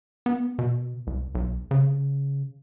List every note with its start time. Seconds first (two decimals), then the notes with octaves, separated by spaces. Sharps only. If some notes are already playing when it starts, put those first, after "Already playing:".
0.26 B3
0.59 B2
1.07 C2
1.35 B1
1.71 C#3